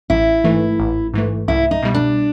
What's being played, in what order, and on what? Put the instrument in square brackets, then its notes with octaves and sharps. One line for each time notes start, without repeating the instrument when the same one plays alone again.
[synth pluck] A1 [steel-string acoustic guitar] E4
[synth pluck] G#2 E3 A3
A1
G#2 E3 A3
[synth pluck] C2 [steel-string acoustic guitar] E4
[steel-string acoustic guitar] D#4
[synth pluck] B2 G3
[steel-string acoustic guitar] D4